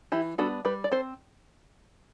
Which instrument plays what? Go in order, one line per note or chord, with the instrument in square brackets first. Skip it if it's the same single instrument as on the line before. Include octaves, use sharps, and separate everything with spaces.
[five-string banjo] E3 E4 G4
G3 B3 D4 F#4 A4
G3 G4 B4
D5
C4 A4 C5